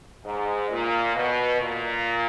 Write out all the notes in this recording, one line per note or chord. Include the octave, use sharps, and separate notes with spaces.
G#2
A#2
B2
A#2